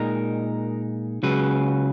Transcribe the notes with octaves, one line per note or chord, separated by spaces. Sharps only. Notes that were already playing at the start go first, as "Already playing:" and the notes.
Already playing: A#2 G#3 D#4 A#4
C#2 C#3 F#3 B4